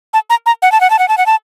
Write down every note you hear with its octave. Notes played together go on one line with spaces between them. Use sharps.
A5
A#5
A#5
F#5
A5
F#5
A5
F#5
A5
F#5
A5